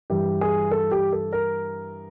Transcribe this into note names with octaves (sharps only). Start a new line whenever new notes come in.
G2 E3 G3 G4
G#4
A4
G4
A4
A#4